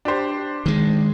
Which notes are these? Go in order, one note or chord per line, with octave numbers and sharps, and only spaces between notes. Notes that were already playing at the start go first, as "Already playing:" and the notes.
D4 G4 C5
D#3 G#3